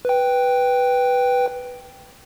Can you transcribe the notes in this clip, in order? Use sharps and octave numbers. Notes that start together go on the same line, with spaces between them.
B4 G5